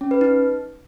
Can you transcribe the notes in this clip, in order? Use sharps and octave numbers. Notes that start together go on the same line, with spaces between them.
C#4
B4
D#4